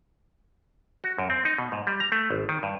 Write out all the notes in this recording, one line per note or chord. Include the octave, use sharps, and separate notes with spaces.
F#4
F#2
C4
D#4
B2
G#2
G3
A#5
A3
G#1
D#3
G2